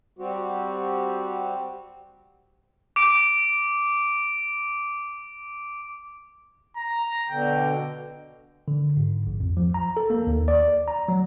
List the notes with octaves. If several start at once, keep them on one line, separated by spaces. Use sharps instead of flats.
G3 C4 F#4 G4
D6 D7
A#5
B2 D3 G5
D3
G#2
A#1
F2
F3
A#5
A4
A#3
D#2
D5
A#5
F#3